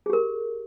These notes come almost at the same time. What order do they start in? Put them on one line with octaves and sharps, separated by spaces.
G#4 G4 A#4